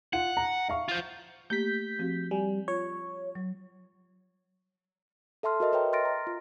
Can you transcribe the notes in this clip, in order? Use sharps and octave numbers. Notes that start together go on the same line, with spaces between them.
F4 F#5
A#5
E5 F5 C#6
F4 C5
A3 A#3 G4 G6 B6
F3 C4 F#4
G3 G#5
F4 C#5
F#3
A4 E5 A5 C6 F6
F#4 A#4 D#5 E5
B4 C#5 D#5 E5 G5 A#5
C6 F6 A6 A#6 D7
A#5
F4